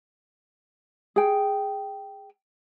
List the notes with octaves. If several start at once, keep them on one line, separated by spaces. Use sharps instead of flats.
G#4 G5